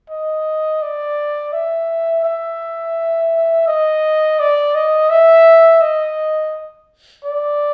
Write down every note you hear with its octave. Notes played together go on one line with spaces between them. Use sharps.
D#5
D5
E5
E5
D#5
D5
D#5
E5
D#5
D5